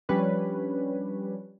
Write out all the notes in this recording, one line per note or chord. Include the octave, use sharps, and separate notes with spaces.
F3 G3 C#4 D4 B4 C#5